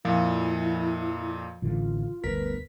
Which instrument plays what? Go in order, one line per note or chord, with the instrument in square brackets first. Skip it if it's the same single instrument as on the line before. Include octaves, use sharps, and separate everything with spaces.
[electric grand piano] F2 A#2 [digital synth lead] F3 [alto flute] E4
[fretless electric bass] A1 D3 E3 [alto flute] F4
[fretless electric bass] G1 D2 [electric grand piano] A#4 [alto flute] B4 [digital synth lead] B6